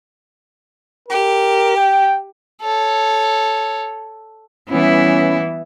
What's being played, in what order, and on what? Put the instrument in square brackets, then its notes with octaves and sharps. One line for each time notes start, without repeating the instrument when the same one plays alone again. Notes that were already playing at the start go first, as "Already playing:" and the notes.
[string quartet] G4 [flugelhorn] A#4
[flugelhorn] G5
[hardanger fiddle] A4 C#5
[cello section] E3 G3 B3 [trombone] C#4 [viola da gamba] E4